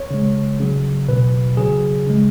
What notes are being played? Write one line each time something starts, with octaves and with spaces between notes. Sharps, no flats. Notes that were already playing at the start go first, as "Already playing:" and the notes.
Already playing: C#5
C#3 G#3
C#3 F#3
B2 F#3 B4
C#3 F#3 G#4
C#3 G#3